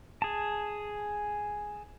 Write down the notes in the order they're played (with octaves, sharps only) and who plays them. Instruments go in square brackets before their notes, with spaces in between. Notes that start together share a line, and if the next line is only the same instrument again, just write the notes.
[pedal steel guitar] G#4 A5